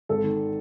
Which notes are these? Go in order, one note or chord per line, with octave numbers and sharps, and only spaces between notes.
G#1 A4
D#3